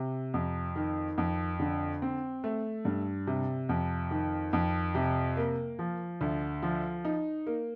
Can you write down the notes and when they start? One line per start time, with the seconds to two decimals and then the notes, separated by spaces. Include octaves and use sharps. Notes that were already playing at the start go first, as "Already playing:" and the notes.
Already playing: C3
0.34 F2
0.76 D#3
1.18 F2
1.60 D3
2.02 C4
2.44 A3
2.85 G2
3.27 C3
3.69 F2
4.11 D#3
4.53 F2
4.95 C3
5.37 A#3
5.79 F3
6.21 D2
6.63 F3
7.05 D#4
7.47 A#3